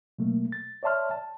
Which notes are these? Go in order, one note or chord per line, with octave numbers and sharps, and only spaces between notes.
B2 F#3 A3 A#3
A6
C#5 D5 E5 A5 C6 F6
A5